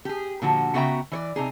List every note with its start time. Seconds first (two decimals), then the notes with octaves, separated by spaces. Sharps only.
0.05 G4 G#4
0.42 A#2 D3 F3 F#4
0.74 C#3 B3 F#4 E5 G5 A#5
1.12 E3 C#5 D5
1.36 C3 D#4 G#4